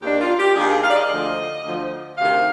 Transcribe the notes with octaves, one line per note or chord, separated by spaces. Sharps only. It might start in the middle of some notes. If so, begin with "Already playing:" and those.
D#2 D#3 A#3 D4 G4
F4
G4
D#2 D#3 A#3 D4 G#4
G#4
F5
D5
D#5
D2 D3 F3
D2 D3 F3
D2 C3 D#3 F5